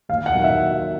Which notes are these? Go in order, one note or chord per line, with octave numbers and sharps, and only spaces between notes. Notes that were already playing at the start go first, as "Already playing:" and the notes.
D#2 F5
F#5
D#3 F#3
E5